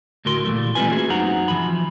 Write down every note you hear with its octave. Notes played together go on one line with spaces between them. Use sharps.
D2 A2 F#4 A#4 C6
A#2 E3 F#3 G3 A3
G3 G#3 C4 F4 B4 G#5
A3 A#3 C#4 F#4 G#4
F#2 C4 D#4 F#4 F#5 A#5
E3 F3 B5